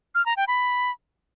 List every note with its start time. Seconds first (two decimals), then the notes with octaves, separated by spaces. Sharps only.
0.15 F6
0.26 A#5
0.37 G5
0.48 B5